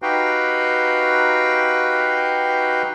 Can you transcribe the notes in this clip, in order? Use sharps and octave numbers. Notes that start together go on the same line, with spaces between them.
D#4 F#4 G4 B4 F5 G5